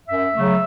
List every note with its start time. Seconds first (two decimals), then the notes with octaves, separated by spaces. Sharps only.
0.09 F#2 E5
0.34 C#3 F#3 A3